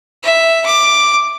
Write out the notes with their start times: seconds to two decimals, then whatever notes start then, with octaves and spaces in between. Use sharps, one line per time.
0.23 E5
0.66 D6